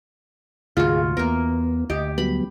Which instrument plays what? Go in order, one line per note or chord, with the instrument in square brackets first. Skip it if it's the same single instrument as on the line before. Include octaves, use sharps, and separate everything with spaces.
[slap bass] D2 G#2 C3 [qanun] F4 F#4 [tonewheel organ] G#4 F5
[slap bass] E2 [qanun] A#3 A#4 [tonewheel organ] B3
[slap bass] D2 [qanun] G4 [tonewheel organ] D#5
[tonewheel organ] F#3 G3 B3 [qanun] B5